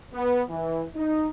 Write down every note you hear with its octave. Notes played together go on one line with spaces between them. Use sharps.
B3
E3
D#4